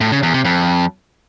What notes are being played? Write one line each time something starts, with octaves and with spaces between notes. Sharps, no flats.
A2
C#3
E2
C3
F2